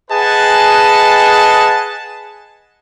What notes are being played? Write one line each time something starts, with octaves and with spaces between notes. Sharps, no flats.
G#4 B4 D#5 F#5 G#5 A5